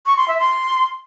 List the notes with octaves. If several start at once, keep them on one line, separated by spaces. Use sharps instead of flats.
C#6
C6
E5
C6